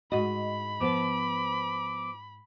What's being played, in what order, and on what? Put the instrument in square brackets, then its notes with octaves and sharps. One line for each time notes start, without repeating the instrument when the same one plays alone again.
[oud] G#2 D#5 [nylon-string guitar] F#4 [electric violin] B5
[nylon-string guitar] F3 B3 [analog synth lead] D6